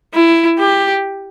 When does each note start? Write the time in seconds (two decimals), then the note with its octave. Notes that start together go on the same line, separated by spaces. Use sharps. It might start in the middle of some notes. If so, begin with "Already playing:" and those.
0.15 E4
0.59 G4